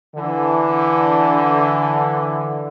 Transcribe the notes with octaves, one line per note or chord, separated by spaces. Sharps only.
D3 E3